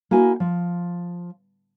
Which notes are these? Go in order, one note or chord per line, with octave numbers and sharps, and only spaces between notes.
A#3 E4 F#4 G#5
F3